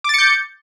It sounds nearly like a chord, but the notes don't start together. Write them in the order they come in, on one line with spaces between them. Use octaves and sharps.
D6 A6 C#7 G6